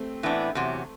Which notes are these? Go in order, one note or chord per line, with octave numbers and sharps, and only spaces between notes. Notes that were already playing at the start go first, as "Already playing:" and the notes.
Already playing: A3 C4
A2 E3 B3 D4
E2 C3 F#3